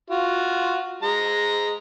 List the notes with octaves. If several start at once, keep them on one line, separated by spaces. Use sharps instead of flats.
F4 F#4
G#3 A#5